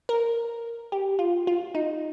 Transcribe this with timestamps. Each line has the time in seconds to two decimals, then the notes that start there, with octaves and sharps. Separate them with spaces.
0.09 A#4
0.92 G4
1.19 F4
1.47 F4
1.75 D#4